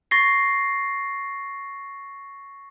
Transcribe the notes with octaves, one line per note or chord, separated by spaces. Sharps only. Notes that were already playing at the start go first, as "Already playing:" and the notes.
C#6 A6 A#6 C7